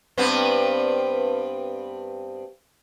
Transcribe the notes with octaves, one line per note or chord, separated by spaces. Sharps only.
G2 B3 C4